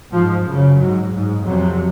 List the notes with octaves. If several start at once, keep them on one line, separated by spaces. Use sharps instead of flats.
G#2 F3
F#2 C#3
G#2 F#3
G#2
F2 C3 F#3